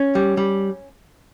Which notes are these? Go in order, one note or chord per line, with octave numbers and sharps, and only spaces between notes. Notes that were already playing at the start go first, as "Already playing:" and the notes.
Already playing: C#4
G3
G3